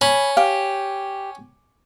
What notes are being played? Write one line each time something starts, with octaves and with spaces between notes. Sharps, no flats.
C#4 B5
G4 F5